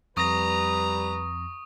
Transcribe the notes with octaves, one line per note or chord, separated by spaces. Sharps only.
F2 G3 B4 A#5 C#6 D#6 A#6